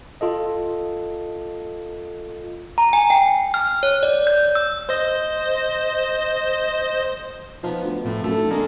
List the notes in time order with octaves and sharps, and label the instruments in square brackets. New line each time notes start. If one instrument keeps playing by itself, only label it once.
[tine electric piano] F4 A4 D#5
[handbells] A#5
G#5
G5
F6
C#5
D5
G6
E6
[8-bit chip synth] C5 D#5
[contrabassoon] F3 [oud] B3 D#4
[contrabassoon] D2
[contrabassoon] F2 [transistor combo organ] A2
[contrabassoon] F#2 [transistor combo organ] A3 [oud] A4
[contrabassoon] F1
[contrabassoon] D3 [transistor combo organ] G#3 A#3